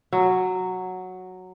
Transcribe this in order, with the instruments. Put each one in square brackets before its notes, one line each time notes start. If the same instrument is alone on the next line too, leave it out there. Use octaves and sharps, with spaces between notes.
[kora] F#3